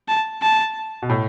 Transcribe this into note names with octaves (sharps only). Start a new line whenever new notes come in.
A5
A5
B2
A2